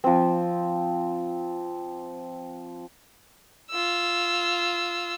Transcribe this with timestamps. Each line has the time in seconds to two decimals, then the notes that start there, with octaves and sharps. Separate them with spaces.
0.04 F3 C4
3.71 F4 E6